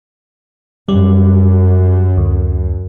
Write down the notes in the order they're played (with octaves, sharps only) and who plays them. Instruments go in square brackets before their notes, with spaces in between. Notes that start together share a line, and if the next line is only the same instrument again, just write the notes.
[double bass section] F#2 [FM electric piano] G3
[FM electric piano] D2